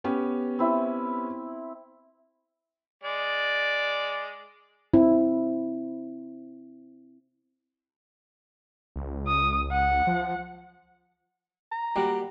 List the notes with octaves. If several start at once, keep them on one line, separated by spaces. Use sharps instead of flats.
B3 C#4 G4
C4 E4
G#3 D5
C4 E4
C#2
D#6
F#5
F3
A#5
G3 A#3 F#4 G4